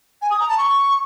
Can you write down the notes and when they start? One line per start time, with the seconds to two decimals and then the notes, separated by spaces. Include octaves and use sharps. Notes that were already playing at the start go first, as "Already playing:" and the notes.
0.21 G#5
0.30 D#6
0.39 A#5
0.48 A5
0.57 C#6